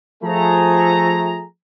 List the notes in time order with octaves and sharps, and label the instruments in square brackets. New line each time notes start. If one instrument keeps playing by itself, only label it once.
[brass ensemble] F3 A3 G#4 A#5